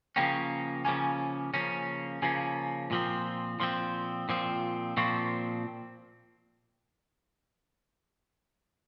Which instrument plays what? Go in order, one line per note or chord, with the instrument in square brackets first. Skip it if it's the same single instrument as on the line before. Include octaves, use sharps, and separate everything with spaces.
[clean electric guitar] C#3 F3 A#3 C#4 [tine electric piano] G5
[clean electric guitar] C#3 F3 A#3 C#4 [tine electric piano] G#5
[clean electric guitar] C#3 F3 A#3 C#4
[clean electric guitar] C#3 F3 A#3 C#4 [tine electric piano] G#5
[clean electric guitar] A#2 F3 C4
[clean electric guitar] A#2 F3 C4 [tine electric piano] C6
[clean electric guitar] A#2 F3 C4
[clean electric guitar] A#2 F3 C4 [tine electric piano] C#6